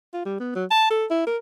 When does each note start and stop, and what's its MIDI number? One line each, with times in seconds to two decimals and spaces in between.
0.14 0.25 65
0.25 0.36 55
0.40 0.51 59
0.55 0.65 54
0.71 0.87 81
0.91 1.05 69
1.10 1.22 64
1.27 1.37 70